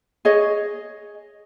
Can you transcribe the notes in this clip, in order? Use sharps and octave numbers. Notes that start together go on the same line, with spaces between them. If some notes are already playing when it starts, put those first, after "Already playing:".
G#4 C#5 D#5